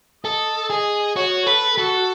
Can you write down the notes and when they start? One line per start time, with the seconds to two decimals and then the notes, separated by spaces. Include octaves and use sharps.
0.24 A4 D#5
0.70 G#4 D#5
1.16 F#4 C#5
1.47 A4 B4
1.77 F#4 A4